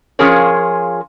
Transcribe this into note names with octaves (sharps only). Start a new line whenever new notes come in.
F3 C#4 F4 G#4 A#4 C#5